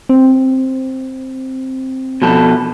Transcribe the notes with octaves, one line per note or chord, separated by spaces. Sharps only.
C4
B2 F3 A4